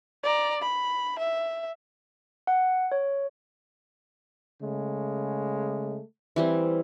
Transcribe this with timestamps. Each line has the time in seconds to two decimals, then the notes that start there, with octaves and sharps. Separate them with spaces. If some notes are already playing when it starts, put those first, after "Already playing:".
0.23 D5 A#5
0.61 B5
1.18 E5
2.47 F#5
2.92 C#5
4.62 C#3 G#3 A3
6.36 E3 G3 C4